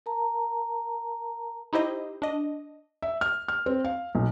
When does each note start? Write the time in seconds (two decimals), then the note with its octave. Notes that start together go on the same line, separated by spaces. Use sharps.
0.06 A#4 A5 A#5
1.73 D#4 E4 G4 C5 D#5
2.22 D4 D#5
3.02 E5
3.21 F6
3.48 F6
3.66 C4
3.84 F5
4.15 B1